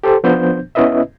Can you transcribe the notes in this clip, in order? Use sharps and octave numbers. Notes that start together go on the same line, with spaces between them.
G4 A4 C5
F3 B3 D4 C5 G6
B3 C#4 E4 B4 D#5 E5